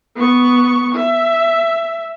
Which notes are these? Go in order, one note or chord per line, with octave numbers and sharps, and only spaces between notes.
B3 C#6
E5